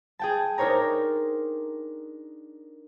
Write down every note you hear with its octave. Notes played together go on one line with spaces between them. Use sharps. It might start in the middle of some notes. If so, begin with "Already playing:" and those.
G#4 G5 A5
D4 D#4 A#4 C5 C#5 A#5